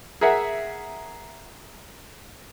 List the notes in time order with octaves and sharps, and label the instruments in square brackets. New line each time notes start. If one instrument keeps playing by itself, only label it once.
[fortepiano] G#4 A#4 E5 F#5